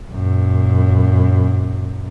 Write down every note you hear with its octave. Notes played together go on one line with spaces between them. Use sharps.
F#2 A#2